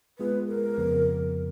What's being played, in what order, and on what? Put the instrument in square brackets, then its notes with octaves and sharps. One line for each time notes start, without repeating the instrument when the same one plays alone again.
[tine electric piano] G#3 B3 F4 G#4 [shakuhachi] B4
[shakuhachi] A#4
[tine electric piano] F2 C#3 F3 B3